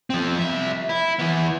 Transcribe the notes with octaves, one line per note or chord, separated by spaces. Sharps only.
F3 C4
C2 E5
E4
E3 B3